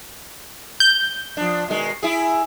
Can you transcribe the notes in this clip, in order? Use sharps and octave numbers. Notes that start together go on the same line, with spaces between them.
G6
F3 D4
B2 D#3 G#3
E4 G#4